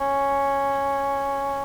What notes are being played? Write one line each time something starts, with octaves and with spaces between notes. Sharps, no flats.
C#4